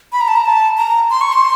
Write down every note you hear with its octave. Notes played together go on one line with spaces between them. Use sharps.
B5
A#5
A5
A#5
A5
A#5
C6
C#6
C6